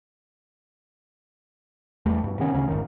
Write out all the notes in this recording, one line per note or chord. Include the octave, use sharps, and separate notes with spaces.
E2 G3 A3
G2 B2
C3 D#3 B3 C#4
D2 C#3 A3 C#4
G#1 F#2 D#3